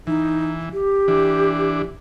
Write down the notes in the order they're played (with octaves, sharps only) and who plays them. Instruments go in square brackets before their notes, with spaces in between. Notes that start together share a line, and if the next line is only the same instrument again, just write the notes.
[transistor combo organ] E3 [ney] D#4
[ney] G4
[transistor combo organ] E3 D4